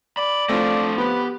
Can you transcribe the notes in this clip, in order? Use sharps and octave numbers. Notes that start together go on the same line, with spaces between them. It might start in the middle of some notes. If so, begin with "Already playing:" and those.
D5 B5
F3 A3 C4 D4
B3 G4 B4